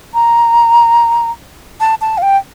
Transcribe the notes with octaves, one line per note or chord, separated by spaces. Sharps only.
A#5
A5
A5
F5
G5